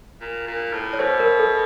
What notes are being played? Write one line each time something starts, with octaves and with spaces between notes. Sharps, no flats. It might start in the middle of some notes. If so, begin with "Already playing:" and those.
A#2
A#2
A2
C#5
B2 C5
A#4
A4